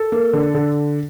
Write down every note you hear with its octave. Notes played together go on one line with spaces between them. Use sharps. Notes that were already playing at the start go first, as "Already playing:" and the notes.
Already playing: A4
A#3
D3
D3